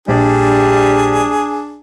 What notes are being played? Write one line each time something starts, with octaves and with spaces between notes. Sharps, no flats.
A#1 G3 D4 G#4